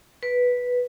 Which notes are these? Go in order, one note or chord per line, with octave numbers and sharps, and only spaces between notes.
B4